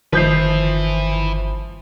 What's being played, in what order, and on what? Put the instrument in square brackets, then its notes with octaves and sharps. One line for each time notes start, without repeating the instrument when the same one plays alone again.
[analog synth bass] G1 [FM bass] D#3 [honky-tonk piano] F3 G6 C7 [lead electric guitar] B4 E5